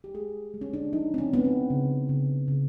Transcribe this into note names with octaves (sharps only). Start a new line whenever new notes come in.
G4
G#3 G#4
G#3
C#4
D4
F3 D#4
C4
C#4
G#3 B3
C4
C#3
C#3
C#3